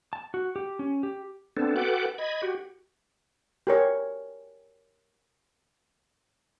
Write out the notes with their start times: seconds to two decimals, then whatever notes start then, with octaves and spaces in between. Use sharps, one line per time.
0.13 A5
0.34 F#4
0.56 G4
0.79 C#4
1.03 G4
1.57 B3 C4 D4 A4
1.76 F#4 A4 B4 F#5 G5 D6
2.18 D#5 B5 G#6
2.42 F#4 G4
3.67 G4 A#4 C#5